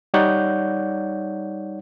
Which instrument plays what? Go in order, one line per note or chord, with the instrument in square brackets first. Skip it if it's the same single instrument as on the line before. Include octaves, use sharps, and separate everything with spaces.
[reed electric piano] G3 D#4 C#5 D5 F#5 G6